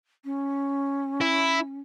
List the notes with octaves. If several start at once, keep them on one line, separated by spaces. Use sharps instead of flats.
C#4
E4